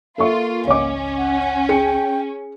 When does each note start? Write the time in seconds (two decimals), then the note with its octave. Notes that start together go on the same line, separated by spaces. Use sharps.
0.18 A#3 F4 A4 E5 C#6
0.67 G#1 C#2 C#4 C#5 D#5 D6
1.18 F#5
1.69 G#4 G5 C#7